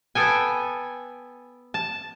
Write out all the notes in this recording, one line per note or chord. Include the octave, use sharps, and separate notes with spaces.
B3 A4 G5 G#5
A5